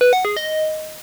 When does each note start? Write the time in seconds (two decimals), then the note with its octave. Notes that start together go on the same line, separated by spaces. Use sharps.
0.01 B4
0.13 F#5
0.25 G#4
0.37 D#5